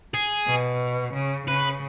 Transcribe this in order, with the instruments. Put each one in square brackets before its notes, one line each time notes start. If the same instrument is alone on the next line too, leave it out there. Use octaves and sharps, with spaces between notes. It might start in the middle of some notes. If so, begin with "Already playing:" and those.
[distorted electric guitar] G#4
[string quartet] B2
C#3
[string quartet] C#3 [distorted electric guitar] B4